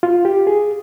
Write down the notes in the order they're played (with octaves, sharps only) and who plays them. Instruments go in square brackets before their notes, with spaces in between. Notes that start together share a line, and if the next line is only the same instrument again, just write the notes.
[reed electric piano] F4
G4
G#4